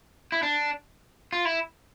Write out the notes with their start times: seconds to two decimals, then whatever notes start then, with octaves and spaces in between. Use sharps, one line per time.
0.32 E4
0.43 D4
1.33 F4
1.45 E4